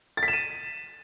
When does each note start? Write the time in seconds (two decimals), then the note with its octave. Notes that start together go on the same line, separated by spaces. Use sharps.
0.17 A6
0.23 B6
0.28 E7
0.33 D#7